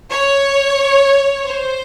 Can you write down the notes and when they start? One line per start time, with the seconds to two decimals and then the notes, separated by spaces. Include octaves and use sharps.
0.10 C#5
1.45 C5